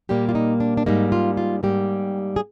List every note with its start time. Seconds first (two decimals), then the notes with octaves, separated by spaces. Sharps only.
0.09 A#2 G3 A#3 G4
0.29 F4
0.35 D#4
0.60 D4
0.77 D4
0.86 G#2 G3 A#3 D#4
1.12 F4
1.37 F4
1.63 G#2 G3 A#3 G4
2.36 G#4